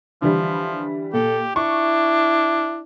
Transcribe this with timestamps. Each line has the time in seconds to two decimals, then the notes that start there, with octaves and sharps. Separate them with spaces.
0.22 D3 E3 F3 G3
1.13 A#2 G4 A4
1.56 D4 E4 C#6